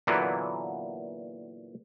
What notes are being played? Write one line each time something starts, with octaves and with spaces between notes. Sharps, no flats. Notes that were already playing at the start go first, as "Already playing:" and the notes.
A#2 D3 E3 F#3 A#3 B3